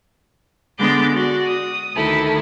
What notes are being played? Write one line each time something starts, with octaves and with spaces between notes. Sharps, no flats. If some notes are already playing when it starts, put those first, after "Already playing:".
D3 G#3 B3 D4 D6 G6
F#4 D5
D#6
D2 D#3 E4 A4